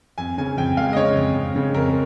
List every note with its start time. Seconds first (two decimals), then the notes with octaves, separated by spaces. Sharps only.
0.18 F2 G#5
0.38 C#3 G#5
0.57 F2 G5
0.77 G#3 F5
0.93 D#5
0.96 C#3 C#5
1.16 F2
1.36 F2
1.56 C#3
1.74 F2 A#4